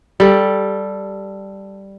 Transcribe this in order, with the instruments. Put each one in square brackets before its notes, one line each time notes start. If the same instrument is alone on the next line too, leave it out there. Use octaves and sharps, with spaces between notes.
[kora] G3 A4